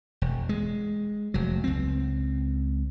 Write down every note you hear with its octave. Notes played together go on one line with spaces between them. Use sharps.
E1
G#3
F1 F#3
C#2 C4